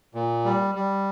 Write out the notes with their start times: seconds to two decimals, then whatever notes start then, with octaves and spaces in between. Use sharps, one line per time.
0.15 A#2
0.45 G3
0.75 G3